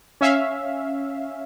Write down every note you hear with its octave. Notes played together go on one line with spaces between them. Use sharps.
C#4 E5 F5